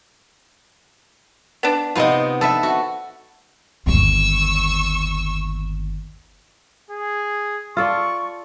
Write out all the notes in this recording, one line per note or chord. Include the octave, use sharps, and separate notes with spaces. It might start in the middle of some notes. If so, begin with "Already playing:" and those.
B3 D4
C3 B3 D#4 F4 D#5
D3 A4 B4 E5
F#4
G1 D#2 C#6 E6
G#4
F4 A4 D5 C#6